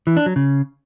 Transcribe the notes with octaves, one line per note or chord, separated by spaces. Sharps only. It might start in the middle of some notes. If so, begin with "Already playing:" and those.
E3
D4
F#3
C#3